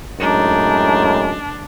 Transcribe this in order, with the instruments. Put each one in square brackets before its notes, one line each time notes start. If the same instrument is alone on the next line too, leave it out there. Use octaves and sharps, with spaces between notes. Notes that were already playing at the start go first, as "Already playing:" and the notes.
[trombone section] F#2 A2 G#3 [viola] D4 [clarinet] D#4